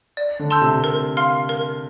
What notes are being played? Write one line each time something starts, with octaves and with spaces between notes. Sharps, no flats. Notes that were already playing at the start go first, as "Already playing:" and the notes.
D5
D3
A5 C6 E6 G6
C3
A#4
F5 C6 F6
A#4